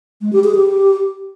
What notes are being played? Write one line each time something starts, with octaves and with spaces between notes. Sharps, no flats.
G#3
G4
G#4
G4